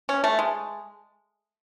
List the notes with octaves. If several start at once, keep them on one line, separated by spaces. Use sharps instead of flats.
C#4
A3
G#3